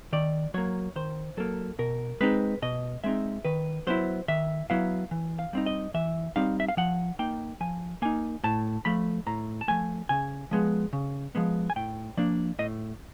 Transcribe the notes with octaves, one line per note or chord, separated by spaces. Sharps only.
D#3 D5
F#3 A#3 C#5
D#3 C5
F#3 A#3 A4
B2 A#4
G#3 C4 D#4 B4
B2 D#5
G#3 C4 D#4 E5
D#3 B4
F#3 B3 E4 C5
D#3 E5
F#3 B3 E4 F5
E3
F5
G3 C4 D#4
D#5
E3 E5
G3 C4 D#4 F5
E5
F5
F3 F#5
A#3 D#4 G5
F3 G#5
A#3 D#4 G#5
A2 A5
F3 A3 B5
A2 A#5
A5
F3 A3 G#5
C#3 G#5
F3 G#3 B3
C#3
F3 G#3 B3
G#5
A2 G5
F3 A#3 D4 D5
A2 D#5